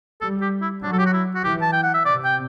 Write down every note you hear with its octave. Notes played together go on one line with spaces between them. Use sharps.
G3 A4
G4
E4
F#3 D4
A4
G4
F#4
E4
F#4
E3 G4
A5
G5
F#5
E5
C3 D5
G5